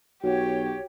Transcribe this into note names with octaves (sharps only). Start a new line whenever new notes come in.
B1 F#4 G4 C#5